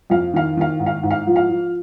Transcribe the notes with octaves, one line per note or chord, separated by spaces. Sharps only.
F2 F5
D#3 F5
D#3 F5
G#2
F5
G#2
F5
F3
F5
F3